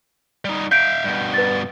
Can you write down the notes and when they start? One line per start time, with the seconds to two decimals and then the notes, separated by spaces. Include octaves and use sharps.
0.45 G3 D#4
0.72 E5 F5 G6 D7
1.04 G2 B2
1.34 B4 A6